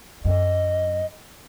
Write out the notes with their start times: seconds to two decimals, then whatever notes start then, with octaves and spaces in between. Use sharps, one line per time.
0.25 F#2 D#5